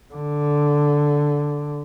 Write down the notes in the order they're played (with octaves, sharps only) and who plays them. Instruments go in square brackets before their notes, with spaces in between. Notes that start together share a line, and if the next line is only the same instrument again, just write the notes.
[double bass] D3